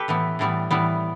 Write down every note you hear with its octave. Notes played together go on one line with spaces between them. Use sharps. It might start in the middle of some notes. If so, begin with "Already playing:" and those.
Already playing: G4 A4 B4
A2 E3 B3
A2 E3 G3 B3
A2 E3 G3 B3